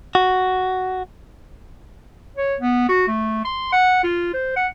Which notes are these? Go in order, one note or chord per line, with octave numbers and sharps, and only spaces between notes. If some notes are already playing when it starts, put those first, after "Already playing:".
F#4
C#5
B3
F#4
A3
C6
F#5
F4
C5
F#5